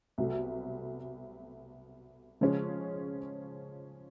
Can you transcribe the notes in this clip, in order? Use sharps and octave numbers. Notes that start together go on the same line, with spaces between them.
C2 B2 F#3 A3
C#3 F3 G#3 C#4